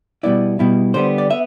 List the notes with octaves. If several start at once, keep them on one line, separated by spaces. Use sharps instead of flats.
B2 G3 B3 E4 D5
B2 G3 B3 E4
D3 G3 B3 C5
D5
B3 E5